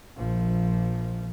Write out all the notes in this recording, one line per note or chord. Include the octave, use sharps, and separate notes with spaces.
A#1 F3